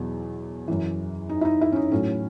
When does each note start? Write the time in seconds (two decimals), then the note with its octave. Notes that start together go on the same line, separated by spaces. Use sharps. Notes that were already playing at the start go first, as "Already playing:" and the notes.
Already playing: E2 B2 F#3
0.68 F#2 E3
1.29 D#4
1.41 E4
1.45 D#4
1.61 E4
1.72 C#4
1.76 D#4
1.92 A2 F#3 C#4